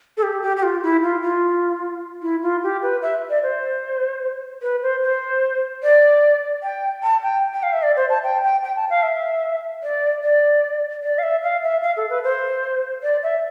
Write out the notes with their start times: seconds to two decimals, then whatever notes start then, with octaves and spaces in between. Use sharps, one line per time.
0.17 A4
0.23 G4
0.42 G4
0.57 G4
0.63 F4
0.83 E4
1.03 F4
1.23 F4
2.22 E4
2.42 F4
2.63 G4
2.83 B4
3.02 E5
3.30 D5
3.43 C5
4.62 B4
4.82 C5
5.03 C5
5.83 D5
6.63 G5
7.03 A5
7.23 G5
7.53 G5
7.63 F5
7.73 E5
7.83 D5
7.97 C5
8.10 A5
8.24 G5
8.43 G5
8.63 G5
8.76 A5
8.90 F5
9.03 E5
9.83 D5
10.23 D5
11.03 D5
11.19 F5
11.23 E5
11.43 F5
11.63 E5
11.83 F5
11.97 A4
12.10 B4
12.24 C5
13.03 D5
13.23 E5